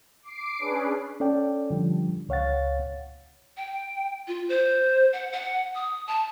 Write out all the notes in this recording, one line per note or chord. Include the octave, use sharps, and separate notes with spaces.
D6 C7 D7
C#4 D4 G#4 B4
C#4 A4 D5 G5
D3 F3 G3
C#2 C#5 F5 F#5 A6
G5
F4
C5
F#5
F#5
D#6
A5